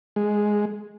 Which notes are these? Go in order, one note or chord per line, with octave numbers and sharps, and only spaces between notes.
G#3